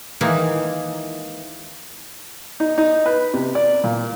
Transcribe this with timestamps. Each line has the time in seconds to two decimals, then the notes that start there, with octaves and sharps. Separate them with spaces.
0.21 D#3 E3 G#3 A#3 D#4 E4
2.60 D#4
2.78 D#4
3.06 B4
3.34 C3
3.55 D5
3.84 A#2